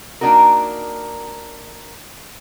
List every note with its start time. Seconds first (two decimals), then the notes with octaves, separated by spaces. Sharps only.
0.21 A#3 D4 D#4 F#4 A#4